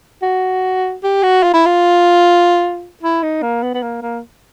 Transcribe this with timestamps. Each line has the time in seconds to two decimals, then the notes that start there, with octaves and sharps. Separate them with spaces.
0.22 F#4
1.03 G4
1.23 F#4
1.43 F4
1.54 E4
1.66 F4
3.03 E4
3.23 D#4
3.42 A#3
3.63 B3
3.74 B3
3.82 A#3
4.02 A#3